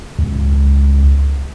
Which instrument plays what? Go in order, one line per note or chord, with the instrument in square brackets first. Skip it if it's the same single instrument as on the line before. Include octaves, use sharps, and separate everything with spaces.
[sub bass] C#2